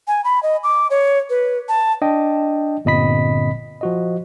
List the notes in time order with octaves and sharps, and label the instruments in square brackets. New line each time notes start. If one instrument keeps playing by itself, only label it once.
[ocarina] G#5
B5
D#5
D6
C#5
B4
A5
[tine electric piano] D4 D#5 G5
G1 A#2 C4 D#5 B5 B6
F3 F#4 D#5